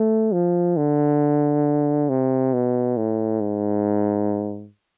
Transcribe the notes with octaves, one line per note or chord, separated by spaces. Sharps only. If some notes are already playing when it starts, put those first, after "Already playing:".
Already playing: A3
F3
D3
C3
B2
A2
G#2